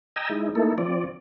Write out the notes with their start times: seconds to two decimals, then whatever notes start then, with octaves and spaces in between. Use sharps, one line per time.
0.16 D#5 G5 G#5 A#5 E6
0.30 G#3 D#4 E4
0.55 A3 A#3 D#4 E4 A4
0.78 F3 C4 D5